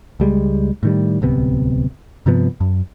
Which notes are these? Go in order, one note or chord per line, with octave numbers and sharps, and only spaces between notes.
C#2 G3 G#3
A2 D#3 G3
D1 C2 C3 B3
G2 C3 F3 B3
F#2